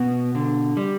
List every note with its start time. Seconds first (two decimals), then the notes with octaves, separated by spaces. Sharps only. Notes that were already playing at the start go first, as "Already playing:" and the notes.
Already playing: B2 B3
0.35 D3
0.77 G3